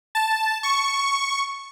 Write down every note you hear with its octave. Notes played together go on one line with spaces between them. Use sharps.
A5
C#6